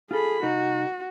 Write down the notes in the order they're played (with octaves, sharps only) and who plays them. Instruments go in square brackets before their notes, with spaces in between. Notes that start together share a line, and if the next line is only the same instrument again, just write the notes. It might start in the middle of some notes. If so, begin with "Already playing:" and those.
[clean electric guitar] F4 A4 [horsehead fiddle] G#4 B5
[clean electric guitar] C2 D#4 A#4 [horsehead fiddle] F#4